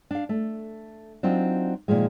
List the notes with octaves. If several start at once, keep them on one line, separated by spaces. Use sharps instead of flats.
D4 F5
A3
F#3 C4 D4 D#4 F4
A#2 D#3 F3 G#3